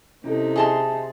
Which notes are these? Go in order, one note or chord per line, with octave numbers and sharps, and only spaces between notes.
C3 C#4 D#4 E4 A4
G#4 D#5 E5 A5 C6 A6